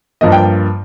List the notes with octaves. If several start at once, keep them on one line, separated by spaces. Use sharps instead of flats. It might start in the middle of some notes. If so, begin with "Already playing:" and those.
G2 F3 A#3 D#5
G5